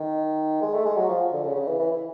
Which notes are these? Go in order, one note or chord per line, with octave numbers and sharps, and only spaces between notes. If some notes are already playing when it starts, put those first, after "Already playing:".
Already playing: D#3
G#3
A3
G#3
F#3
F3
D3
C#3
C#3
E3
E3
E3